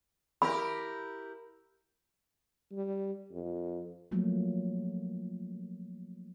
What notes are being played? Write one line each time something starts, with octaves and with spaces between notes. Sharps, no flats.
E4 G4 A#4 B5
G3
F2
F3 F#3 A3 A#3